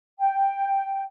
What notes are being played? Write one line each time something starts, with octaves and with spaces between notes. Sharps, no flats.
G5